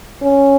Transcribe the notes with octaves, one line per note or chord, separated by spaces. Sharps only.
C#4